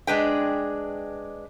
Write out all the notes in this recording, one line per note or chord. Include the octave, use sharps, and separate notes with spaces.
G#3 D4 B4 G5